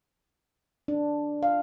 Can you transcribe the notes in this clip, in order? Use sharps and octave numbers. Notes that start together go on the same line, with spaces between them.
D4
F5